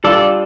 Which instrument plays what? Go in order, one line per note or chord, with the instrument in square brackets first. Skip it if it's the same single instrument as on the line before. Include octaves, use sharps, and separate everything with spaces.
[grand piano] G3 D4 F4 [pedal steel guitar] A4 D5